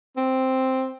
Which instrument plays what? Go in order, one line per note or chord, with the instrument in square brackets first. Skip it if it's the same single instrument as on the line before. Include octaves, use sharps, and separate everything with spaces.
[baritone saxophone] C4